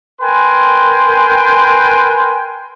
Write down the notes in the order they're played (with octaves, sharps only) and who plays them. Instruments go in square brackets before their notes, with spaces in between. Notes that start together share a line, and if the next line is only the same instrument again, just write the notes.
[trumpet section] A#4 B4 G5 G#5 C6